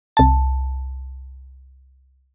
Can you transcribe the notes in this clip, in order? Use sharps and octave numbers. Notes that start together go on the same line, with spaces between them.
C2 A5